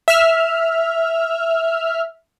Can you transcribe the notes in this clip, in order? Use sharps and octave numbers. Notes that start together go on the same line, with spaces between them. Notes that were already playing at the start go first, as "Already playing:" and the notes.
E5 F6